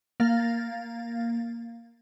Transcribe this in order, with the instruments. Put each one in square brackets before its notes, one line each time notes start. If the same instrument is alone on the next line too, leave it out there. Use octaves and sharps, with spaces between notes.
[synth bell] A#3 F5 A6